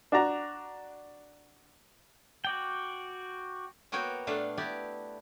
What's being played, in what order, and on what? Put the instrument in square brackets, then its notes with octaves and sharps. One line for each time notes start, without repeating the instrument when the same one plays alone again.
[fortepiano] D4 F#4 A#5
[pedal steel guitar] F#4 D5 G5
[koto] A#3 B3 F#4 A#4 C#5 G5
A#2 A3 B3 D4 F5
B3 E4 G4 D5